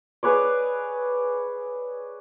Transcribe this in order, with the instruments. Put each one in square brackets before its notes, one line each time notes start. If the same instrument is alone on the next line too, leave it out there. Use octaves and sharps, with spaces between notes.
[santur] G#4 B4 C#5 D5